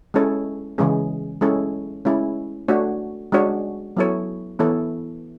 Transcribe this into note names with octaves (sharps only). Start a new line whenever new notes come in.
G#3 C#4 E4 A4 C#5
C#3 E3 G#3 C#4 G#4
G#3 C#4 E4 A4 C#5
G#3 C#4 E4
A3 D4 F#4 C#5
G#3 D4 F#4 C#5
F#3 B3 E4 A4 C#5
E3 B3 E4 A4 C#5